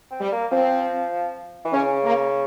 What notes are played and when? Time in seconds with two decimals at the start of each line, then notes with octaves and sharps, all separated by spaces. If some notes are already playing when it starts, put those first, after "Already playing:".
0.11 C4
0.21 G3
0.32 A#3
0.51 F3 C4
1.65 E3
1.73 C#3 C#4
2.04 A#3